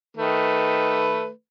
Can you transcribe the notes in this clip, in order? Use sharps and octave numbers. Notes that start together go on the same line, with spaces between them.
D#3 A3 B4